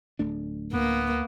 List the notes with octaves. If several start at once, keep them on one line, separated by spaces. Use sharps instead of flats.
D1 A3 D4
D2 A#3 B3